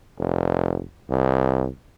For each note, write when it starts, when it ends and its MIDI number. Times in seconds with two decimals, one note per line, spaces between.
0.19 0.82 29
1.10 1.68 36